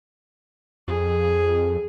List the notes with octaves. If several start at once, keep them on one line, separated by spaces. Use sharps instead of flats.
F2 G#4